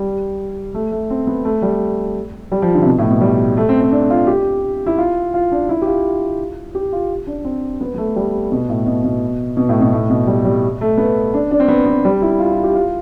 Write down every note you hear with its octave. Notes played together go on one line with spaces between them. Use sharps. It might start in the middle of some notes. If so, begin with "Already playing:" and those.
Already playing: G3
A3
A3
C4
B3
A3
G3
G3
F3
D3
C3
B2
A2
B2
G3
A3
C4
C4
D4
F4
G4
E4
F4
F4
D4
E4
G4
F4
G4
F4
D4
C4
B3
B3
A3
G3
B2
A2
B2
B2
B2
A2
B2
A2
B2
G3
G3
A3
B3
D4
D4
C4
B3
B3
G3
E4
F4
F4
G4
F4